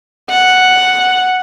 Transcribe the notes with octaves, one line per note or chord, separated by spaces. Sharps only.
F#5